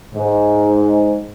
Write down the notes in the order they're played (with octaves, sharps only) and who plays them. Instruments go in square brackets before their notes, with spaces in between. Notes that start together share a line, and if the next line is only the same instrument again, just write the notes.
[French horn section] G#2